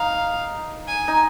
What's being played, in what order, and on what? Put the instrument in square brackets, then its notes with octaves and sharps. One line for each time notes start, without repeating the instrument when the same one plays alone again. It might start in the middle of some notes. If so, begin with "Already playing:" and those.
Already playing: [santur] D#4 [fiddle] F5
[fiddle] G#5
[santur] D#4